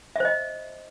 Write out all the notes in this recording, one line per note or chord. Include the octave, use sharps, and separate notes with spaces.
C5 D#5 E5